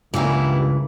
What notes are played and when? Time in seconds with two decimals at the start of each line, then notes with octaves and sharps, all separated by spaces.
0.14 C#2 G2 C#3 E3 G3 A#3 B3 E4